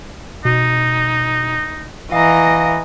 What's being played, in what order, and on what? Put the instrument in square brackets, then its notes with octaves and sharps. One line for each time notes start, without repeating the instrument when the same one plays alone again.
[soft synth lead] B2 [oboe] D#4
[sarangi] E3 [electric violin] D#5 A#5 [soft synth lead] F5